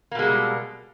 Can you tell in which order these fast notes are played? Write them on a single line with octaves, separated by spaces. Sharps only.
A#3 B2 G#3 G3